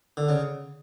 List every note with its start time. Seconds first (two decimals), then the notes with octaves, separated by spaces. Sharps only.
0.17 D3
0.29 C#3